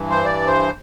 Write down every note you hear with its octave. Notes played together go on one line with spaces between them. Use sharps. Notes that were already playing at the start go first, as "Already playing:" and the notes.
Already playing: G2 E3
C5
D5
C5